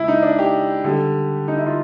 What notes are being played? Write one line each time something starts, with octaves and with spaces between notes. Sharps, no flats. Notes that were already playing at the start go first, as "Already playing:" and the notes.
Already playing: C#3 G#3 E4
D#4
D4
G4
D3 G3
D#4
E4
F4